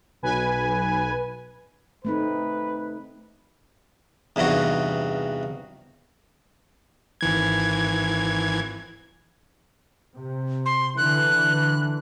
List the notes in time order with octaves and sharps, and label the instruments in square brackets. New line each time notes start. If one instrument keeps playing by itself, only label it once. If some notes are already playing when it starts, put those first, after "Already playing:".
[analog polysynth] B1 B4 G#5
[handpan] A3 C4 D#4 [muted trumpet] B4
[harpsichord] E2 G2 C3 D#4 F#4
[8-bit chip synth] G#1 E3 G#6
[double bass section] C3
[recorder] C6
[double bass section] D3 E3 [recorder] F#6